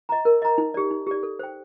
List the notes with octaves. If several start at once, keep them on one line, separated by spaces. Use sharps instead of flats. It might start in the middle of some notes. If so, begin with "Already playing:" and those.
D#5 A#5
A#4
D#5 A#5
D#4
G4 D5
D#4
G4 D5
A4
C5 G5